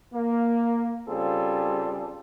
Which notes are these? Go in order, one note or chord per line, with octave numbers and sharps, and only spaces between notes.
A#3
C#3 G3 C4 F4 G#4 A4